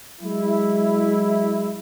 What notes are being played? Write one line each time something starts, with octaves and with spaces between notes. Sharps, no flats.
F#3 G#3 E4